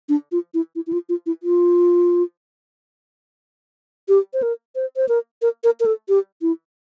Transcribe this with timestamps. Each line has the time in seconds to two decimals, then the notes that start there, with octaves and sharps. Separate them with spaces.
0.09 D4
0.32 F4
0.54 E4
0.76 E4
0.87 E4
0.93 F4
1.09 F4
1.26 E4
1.43 F4
4.08 G4
4.33 C5
4.42 A#4
4.75 C5
4.96 C5
5.09 A#4
5.42 A#4
5.64 A#4
5.80 A#4
5.86 A4
6.09 G4
6.42 E4